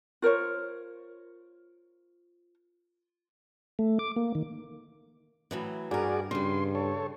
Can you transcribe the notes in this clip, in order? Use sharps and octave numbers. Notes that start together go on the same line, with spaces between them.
F4 A#4 C5 C#5
A3
D6
A#3
D#3
A2 E3 F#3
G2 F#4 G#4 A#4 D5
G2 C#3 G3 C6
A4 C#5